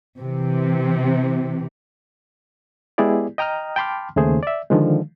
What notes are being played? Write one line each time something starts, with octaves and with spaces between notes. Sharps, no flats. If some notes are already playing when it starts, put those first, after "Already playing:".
C3 E3
G#3 B3 E4 G4 G#4 D5
D#5 G5 A#5 D#6 F6
G5 A5 B5 C6 D6 F6
D#2 C#3 A3 G#4 C5
D5 E5
D3 D#3 F3 G#3